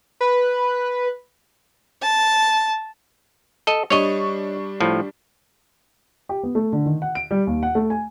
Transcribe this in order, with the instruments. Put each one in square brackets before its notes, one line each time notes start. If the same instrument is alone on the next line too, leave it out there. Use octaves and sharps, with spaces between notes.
[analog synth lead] B4
[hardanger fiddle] A5
[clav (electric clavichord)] A4 D#5
[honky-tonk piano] G3 D4 C#6 [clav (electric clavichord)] C#5 D#5
[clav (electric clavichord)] A2 F3
[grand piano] G4
B3
A3
D3
D#3
F#5
D7
G3
D#2
F#5
A3
G#5